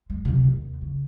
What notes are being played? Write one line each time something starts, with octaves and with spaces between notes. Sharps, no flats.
G#3
C#2 C3
D#2
C#3